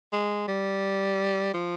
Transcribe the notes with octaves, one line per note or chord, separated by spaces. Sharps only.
G#3
G3
F3